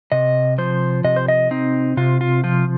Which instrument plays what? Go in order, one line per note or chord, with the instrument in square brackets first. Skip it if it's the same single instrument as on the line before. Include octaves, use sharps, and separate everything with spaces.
[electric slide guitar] C3 D#5
F3 C5
C3 D#5
C5
D#5
C4 D#4
C3 F4
F4
F3 F4